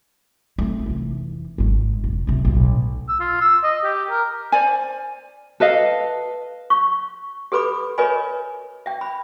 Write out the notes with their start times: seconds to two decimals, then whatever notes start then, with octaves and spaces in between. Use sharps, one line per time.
0.58 A3 C4
0.86 F1 E3
1.58 G#1 G#3
2.04 F1
2.27 C#2 C3
2.45 B1 A2
3.09 E6
3.20 F4
3.41 E6
3.64 D#5
3.84 G4
4.10 A#4
4.52 C5 D5 G#5
5.60 A4 B4 D#5 F5
6.70 C#6
7.52 G4 A4 B4 B5 D6
7.98 A#4 B4 C#5 D#5 G#5 B5
8.86 E5 G5
9.01 B5